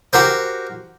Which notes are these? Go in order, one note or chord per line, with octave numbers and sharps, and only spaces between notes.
F#4 G4 A#4 C5